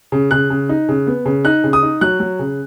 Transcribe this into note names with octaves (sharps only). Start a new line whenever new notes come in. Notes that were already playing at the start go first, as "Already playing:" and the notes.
C#3
C#3 F#6
C#3
D#4
C#3
B3
C#3
D#4 F#6
C#3
D#6
D#4
F#3 F#6
F#3
C#3